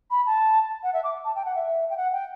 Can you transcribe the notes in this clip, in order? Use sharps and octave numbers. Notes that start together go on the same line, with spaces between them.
B5
A5
F#5
E5
D6
A5
G5
F#5
E5
G5
F#5
G5